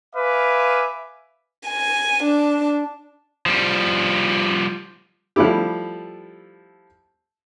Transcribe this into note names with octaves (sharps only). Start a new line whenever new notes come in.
B4 E5 F5 G#5 D6
G#5
D4
F3 G3
F3 G3 A3 E4 G4